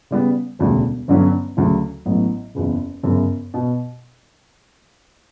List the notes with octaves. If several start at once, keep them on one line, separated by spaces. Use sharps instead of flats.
C#3 G3 B3
E1 D2 C#3 G3
G1 G2 D3 F#3 C#4
D2 C#3 F#3
A1 A2 F#3 B3
F#1 E2 C#3
G1 F#2 C#3
B2